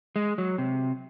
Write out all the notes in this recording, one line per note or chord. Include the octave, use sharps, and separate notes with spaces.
G#3
F#3
C3